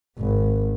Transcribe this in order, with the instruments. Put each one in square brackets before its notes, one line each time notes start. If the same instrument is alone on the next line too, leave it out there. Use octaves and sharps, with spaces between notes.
[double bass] G#1